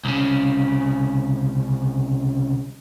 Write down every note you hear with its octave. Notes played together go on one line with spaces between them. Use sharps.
C2 C#3